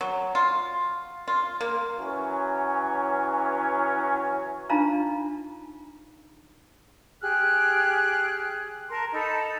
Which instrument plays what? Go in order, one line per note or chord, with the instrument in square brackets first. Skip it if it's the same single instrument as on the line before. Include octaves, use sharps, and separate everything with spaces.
[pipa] F#3
F4
F4
A#3
[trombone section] E3 F#3 C#4
[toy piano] D4 D#4 F4 F5 A5 A#5
[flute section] G4 G#4 F6 F#6
A#4 A5 A#5 C6
D#4 A4 A5 B5